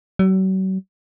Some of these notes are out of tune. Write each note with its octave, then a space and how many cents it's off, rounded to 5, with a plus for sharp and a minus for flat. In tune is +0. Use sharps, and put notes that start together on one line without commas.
F#3 +40